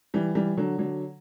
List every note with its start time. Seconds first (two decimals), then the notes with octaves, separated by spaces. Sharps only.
0.14 E3 G3
0.35 E3 G3
0.57 D3 F#3
0.78 D3 F#3